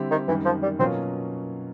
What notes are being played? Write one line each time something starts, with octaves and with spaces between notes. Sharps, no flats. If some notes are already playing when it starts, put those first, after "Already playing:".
Already playing: D3 G3 C4 E4 G4
D#3
F#2 D#3 E3 G3
F3
G3
B2 F#3 A#3 C4 C#4 F4